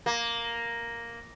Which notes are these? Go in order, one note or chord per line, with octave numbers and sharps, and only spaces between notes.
A#3